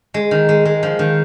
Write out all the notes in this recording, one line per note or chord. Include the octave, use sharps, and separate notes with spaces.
G#3
D#3
G#3
G#3
F3
D#3